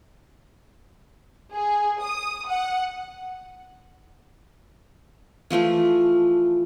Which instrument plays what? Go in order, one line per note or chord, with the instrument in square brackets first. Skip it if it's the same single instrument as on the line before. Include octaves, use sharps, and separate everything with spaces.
[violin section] G#4
D#6
F#5
[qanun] E3 F3 A3 F4